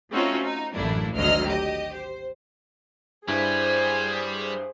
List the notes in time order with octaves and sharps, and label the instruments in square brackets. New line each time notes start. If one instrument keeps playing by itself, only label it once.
[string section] A3 C4 C#4 D#4 F4 F#4
D#4
A1 F#2 A3 A#3 D4 E4
G#1 D2 F#3 D#5 F6
G4 D#5
C5
[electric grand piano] G2 E4 [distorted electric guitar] G3 [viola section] G#4 C5 [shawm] G#5